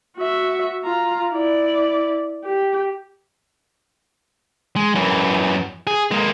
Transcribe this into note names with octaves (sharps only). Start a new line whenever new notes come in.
F#4 E5
F4 A#5
E4 D5
G4
G#3
F#2 E3
G#4
G#3 A#3